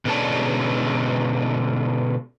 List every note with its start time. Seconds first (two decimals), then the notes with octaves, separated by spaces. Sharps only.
0.05 B2 D3 G#3 C#4 D5 A5